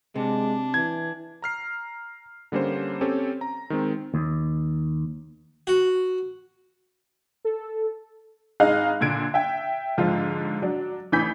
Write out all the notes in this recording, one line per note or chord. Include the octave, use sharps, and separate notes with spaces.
C3 G#3 D4
E3 G#6
A#5 F6 C7
D3 G3 A#3 C#4 C5
C4 C#4 G4 A4 C#5
A#5
D#3 G#3 C4
D#2
F#4
A4
G#1 D#4 G#4 D#5 F5 F#6
A#2 D3 G#6 D7
E5 G5
G#2 D3 F3 F4
F#3 D4
A1 E3 G#5 B5 G6 B6